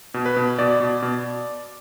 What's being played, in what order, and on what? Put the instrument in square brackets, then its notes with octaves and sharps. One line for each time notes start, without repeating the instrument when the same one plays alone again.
[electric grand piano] B2
B4
B2
B2 D5
B2
B2